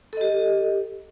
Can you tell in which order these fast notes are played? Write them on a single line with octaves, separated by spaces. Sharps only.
A4 D#5 G4